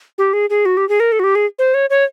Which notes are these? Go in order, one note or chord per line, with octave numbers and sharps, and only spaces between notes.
G4
G#4
G#4
F#4
G4
G#4
A#4
A4
F#4
G4
G#4
C5
C#5
C#5